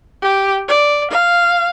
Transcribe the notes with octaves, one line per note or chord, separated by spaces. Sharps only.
G4
D5
F5